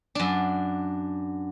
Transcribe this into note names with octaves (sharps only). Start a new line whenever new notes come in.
F#2 D4